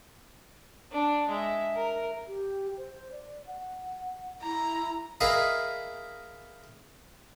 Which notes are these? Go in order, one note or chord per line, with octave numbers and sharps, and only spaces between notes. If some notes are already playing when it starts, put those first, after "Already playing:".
D4
G#3 E5
A#4
G4
C5
D5
F#5
E4 A#5
E4 G#4 A#4 B4 D#5 F5